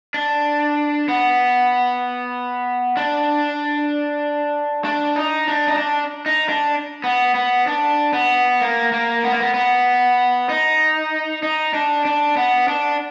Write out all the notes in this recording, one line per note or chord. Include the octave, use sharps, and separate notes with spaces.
D4
B3
D4
D4
D#4
D4
D#4
D4
D#4
D4
B3
B3
D4
B3
A#3
A#3
B3
A#3
B3
B3
D#4
D#4
D4
D4
B3
D4